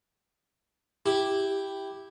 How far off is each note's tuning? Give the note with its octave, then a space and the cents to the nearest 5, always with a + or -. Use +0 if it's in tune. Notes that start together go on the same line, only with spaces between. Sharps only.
E4 +0 G4 +0